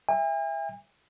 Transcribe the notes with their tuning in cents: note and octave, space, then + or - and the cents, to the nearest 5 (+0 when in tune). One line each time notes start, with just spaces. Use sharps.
E5 +5 G#5 -45